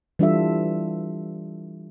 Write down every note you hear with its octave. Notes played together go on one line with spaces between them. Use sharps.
E3 G3 D4 F4 A4 E5